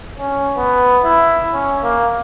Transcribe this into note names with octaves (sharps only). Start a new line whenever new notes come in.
C#4
B3
E4
C#4
A#3